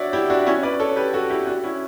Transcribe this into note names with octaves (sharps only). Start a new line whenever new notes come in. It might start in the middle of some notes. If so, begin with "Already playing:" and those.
Already playing: D4 F#4 C#5 D5 E5
E4 G4
D4 F#4
C#4 E4
B4 D5
A4 C#5
G4 B4
F#4 A4
E4 G4
D4 F#4
C#4 E4